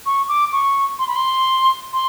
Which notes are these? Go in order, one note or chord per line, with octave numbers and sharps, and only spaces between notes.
C#6
D6
C#6
C6
B5
C6
C6